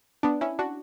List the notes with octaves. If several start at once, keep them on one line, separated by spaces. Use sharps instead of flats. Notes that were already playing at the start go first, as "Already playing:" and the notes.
B3 D4
C#4 E4
D4 F#4